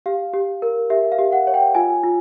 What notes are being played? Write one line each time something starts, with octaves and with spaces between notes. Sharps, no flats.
G4 F5
G4
A#4
G4 E5
F5
G4
F#5
C#5
G5
F4 G#5
F4